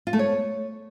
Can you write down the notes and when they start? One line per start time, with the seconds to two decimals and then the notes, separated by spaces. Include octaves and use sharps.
0.07 F4
0.13 A3
0.19 C#5